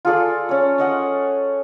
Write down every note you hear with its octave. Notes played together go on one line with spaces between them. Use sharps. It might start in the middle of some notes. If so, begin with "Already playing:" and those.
F4 G#4 A4 D5
C#4 C#5
C#5 D#5 F#5